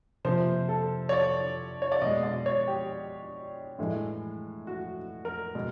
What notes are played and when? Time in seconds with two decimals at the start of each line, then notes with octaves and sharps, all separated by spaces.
0.25 C3 F3 A#3 C5
0.69 A4
1.09 C#5
1.13 D5
1.82 C#5
1.92 D5
2.01 B2 G#3 D#5
2.23 D5
2.46 C#5
2.68 G4
3.79 A2 E3 G#3
4.67 F#4
5.25 A#4
5.55 B2 G#3